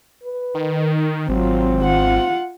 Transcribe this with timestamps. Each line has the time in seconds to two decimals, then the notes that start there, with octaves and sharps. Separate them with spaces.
0.24 B4
0.54 D#3
1.29 G#1 F#3 C4 F4
1.83 F4 F#5